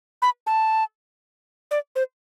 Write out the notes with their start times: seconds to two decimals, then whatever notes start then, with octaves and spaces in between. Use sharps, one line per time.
0.22 B5
0.47 A5
1.71 D5
1.96 C5